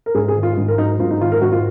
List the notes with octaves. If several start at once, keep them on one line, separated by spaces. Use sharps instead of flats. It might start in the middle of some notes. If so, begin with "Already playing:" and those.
A#4
G#2 G#4
G#4
D#3
F4
G#2
A#4
F#3 D#4
G#2 F4
D#4
D#3 F4
A#4
G#2 F#4
F4